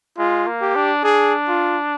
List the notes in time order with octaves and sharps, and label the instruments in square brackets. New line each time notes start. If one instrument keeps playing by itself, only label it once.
[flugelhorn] G#3 [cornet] F4
[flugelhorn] A#3
[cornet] G4
[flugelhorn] D4
[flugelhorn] D4 [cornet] G#4
[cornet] F4